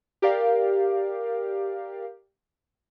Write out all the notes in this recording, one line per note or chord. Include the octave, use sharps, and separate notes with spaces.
G4 A#4 D5 F5